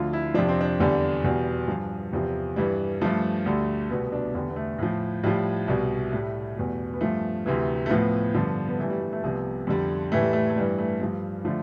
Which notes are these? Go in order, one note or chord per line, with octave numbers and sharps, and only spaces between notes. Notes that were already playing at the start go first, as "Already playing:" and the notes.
Already playing: D2 D3 F3 F4
E4
F2 C3 F3 D4
C4
D4
E2 D3 G3
E2 B2 G3
G2 F3
E2 C3 F3 G3
G2 E3 G3
G2 F3 A3
D2 D3 G3
C2 B2 G3 B3
D4
E2 D3 G3 B3
B3
A3
A2 F3
A2 F3 G3
C2 B2 G3
A2 G3 A3
E2 B2 G3
B3
G2 F3 A3
D2 C3 E3
A3
A2 F3 B3
G2 D3 F3
B3
G2 E3 G3 A3
G3
G3
A3
C2 C3 F3 B3
F2 D3 G3
A2 E3 G3 A3
G3
A3
A3
G2 E3 G3
A3
G2 F3 G3
D3 F3 A3